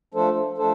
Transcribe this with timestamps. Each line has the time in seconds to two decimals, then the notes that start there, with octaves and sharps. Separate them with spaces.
0.14 F3 A3 D4 A4 C5
0.58 F3 A3 D4 A4 C5